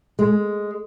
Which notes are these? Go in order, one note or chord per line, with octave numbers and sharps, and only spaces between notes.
G#3